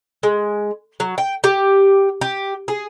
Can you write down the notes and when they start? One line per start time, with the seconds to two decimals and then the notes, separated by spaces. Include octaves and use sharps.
0.23 G#3
1.00 F#3
1.18 G5
1.44 G4
2.21 G4
2.68 G#4